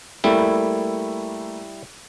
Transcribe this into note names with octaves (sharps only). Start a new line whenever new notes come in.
G3 A3 A#3 E4